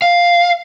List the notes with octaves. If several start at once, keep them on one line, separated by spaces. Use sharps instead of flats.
F5